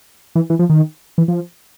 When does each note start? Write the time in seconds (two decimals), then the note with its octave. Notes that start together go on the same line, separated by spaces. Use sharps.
0.35 E3
0.50 E3
0.59 F3
0.70 D#3
1.18 E3
1.28 F3